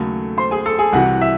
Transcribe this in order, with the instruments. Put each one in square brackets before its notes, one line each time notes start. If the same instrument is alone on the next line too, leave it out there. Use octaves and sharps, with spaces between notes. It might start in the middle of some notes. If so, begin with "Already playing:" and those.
Already playing: [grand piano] D#2 C#3 F#3 A3
C5 C6
G#4 G#5
A4 A5
G#4 G#5
C2 C3 E3 F#4 F#5
E5